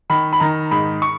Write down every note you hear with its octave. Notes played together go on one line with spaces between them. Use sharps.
D#3 B5
B5
D#3 A#5
G#2 B5
C#6